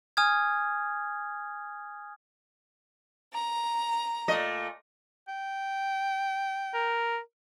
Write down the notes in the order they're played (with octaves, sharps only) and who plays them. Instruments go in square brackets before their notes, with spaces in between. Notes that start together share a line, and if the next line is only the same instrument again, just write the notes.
[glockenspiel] G#5 D#6 F6 G#6
[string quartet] A#5
[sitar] A#2 A3 D#5
[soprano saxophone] G5
[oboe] A#4